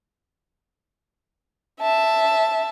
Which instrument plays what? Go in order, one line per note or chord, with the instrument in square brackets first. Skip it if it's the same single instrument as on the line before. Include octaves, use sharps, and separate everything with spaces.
[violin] E5 A5